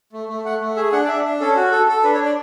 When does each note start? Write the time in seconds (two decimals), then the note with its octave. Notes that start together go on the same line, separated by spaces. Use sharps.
0.13 A3
0.29 A3
0.45 A3 F#5
0.61 A3
0.76 G#4 E5
0.92 D4 F#5
1.04 D5
1.08 D4 E5
1.25 D4
1.40 C#4 A4
1.56 F#4
1.72 A4
1.88 A4
2.04 D4 B4
2.15 C#5
2.20 D4
2.25 D5